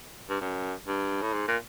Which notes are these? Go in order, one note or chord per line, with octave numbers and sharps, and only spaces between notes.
G2
F#2
G2
A2
G#2
A#2